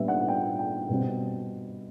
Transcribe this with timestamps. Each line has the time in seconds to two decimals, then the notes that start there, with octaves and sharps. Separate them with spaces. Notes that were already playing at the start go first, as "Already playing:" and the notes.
Already playing: A#2 G3 B3 D4 F4 E5
0.08 F#5
0.28 G5
0.59 G5
0.89 B2 G3 C4